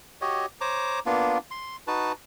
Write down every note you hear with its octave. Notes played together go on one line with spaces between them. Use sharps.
F#4 G4 C#5 D#5
C5 C#5 A#5 D6
A#3 B3 D4 F4
C6
D#4 F#4 B4 A5